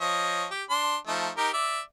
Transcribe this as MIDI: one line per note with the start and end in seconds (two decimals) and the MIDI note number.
0.01 0.46 53
0.01 0.46 73
0.01 0.46 75
0.51 0.63 67
0.70 0.96 62
0.70 0.96 84
1.07 1.29 53
1.07 1.29 57
1.07 1.29 63
1.37 1.49 63
1.37 1.49 67
1.37 1.49 70
1.53 1.80 74
1.53 1.80 76